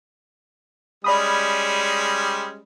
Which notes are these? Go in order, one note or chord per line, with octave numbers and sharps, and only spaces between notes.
G3 G#3 C#4 D5 B5 D#6